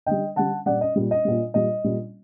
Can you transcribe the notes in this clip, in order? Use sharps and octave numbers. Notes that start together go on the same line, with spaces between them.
D3 G3 D#5 G5
D3 G3 F#5 A5
A#2 G3 D5 F#5
D#5
A#2 G3
D#5
A#2 G3
A#2 G3 D#5
A#2 G3